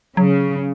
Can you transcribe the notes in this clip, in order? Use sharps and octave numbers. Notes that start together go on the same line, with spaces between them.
C#3 F#3